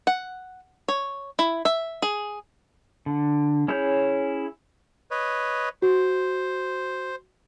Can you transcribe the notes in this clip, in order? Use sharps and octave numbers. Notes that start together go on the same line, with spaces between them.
F#5
C#5
E4
E5
G#4
D3
C#4 E4 G#4 C#5 G6
B4 C#5 D#5
F#4 C5